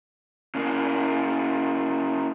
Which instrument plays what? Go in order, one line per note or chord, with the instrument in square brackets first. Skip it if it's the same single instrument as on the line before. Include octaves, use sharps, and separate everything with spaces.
[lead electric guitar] C#3 A#3